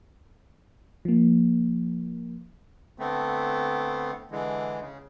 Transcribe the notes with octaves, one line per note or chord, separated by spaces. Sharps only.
F3 A#3
D3 A3 B3 C4
D3 E3 G#3
C#3